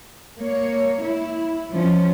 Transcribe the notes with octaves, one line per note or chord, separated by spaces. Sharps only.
A#3 C#5
E4
F3 C#4